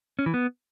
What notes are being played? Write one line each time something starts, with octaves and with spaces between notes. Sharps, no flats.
C#4
E3
B3